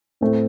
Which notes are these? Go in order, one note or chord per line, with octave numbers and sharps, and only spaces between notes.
A2 A3 C4